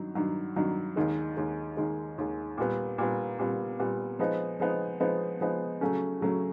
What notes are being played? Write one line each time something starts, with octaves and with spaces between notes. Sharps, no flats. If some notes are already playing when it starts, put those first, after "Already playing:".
Already playing: G2 D#3 F#3
G2 D#3 F#3
G2 D#3 F#3
D#2 D#3 G#3
D#2 D#3 G#3
D#2 D#3 G#3
D#2 D#3 G#3
A#2 G3 B3
A#2 G3 B3
A#2 G3 B3
A#2 G3 B3
F3 G#3 B3 D#4
F3 G#3 B3 D#4
F3 G#3 B3 D#4
F3 G#3 B3 D#4
C#3 F#3 A3 C#4
C#3 F#3 A3 C#4